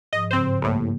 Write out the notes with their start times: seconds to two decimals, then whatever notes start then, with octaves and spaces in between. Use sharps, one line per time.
0.13 G#2 F3 D#5
0.31 G2 C#3 C4 C5 G6
0.62 C2 A2 A#3